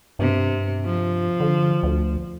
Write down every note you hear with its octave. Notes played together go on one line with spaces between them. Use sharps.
G2 C3
F3
D3
D2